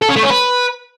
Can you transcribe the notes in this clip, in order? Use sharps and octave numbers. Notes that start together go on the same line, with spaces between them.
A4
C#4
A3
C#4
B4